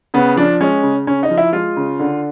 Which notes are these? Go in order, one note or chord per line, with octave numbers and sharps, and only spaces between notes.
C#3 B3
F3 D4
G#3 C#4
C#3
C#3 C#4
D#4
F3
E4
G#3 F4
C#3
D3